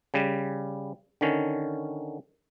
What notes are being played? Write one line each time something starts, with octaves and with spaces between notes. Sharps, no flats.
C#3 G3
D3 D#3 C#4